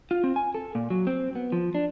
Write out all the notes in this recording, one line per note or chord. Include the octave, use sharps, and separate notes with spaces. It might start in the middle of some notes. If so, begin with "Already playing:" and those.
F4
C4
G#5
A4
A#2
F#3
C4
B3
F3
D4